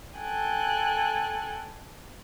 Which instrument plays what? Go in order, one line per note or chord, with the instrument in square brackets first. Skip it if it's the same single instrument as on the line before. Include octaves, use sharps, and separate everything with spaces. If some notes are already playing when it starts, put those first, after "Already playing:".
[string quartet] A4 G5 G#5 F#6